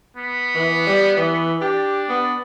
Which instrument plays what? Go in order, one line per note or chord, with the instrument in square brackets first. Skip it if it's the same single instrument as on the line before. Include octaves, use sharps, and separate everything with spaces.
[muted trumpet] B3
[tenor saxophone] E3
G3
E3
[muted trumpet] D4 [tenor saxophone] G4
[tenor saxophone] B3